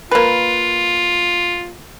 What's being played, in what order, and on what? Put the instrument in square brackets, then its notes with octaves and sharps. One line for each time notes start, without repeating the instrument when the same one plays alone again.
[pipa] A#3 B4 [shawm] F4